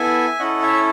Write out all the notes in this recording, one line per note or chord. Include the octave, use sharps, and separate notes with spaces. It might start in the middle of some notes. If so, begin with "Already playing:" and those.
Already playing: B3 E4 A4 E5 G#5
C#4 E4 A4 D#5 F#5
C#5 E5